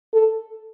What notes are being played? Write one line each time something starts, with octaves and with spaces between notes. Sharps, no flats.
A4